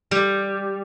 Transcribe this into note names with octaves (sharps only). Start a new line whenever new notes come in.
G3